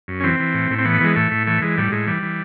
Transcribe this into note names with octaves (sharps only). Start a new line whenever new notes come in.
F#2
C#4
E3 C4
E3
A2
A2
C4
E3 B3
E3 G#3
A2 A3
A2
E3 A3
E3 G#3
A2 G3
A2 G#3
E3 G3
E3